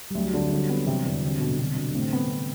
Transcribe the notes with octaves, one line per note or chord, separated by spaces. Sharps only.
G3
D2 F#3
D3
F#3
D3 G3
B3
C3 E3
E2 D3
D3 C4
B2
C3
B2 D3
B2
A2 C4
B3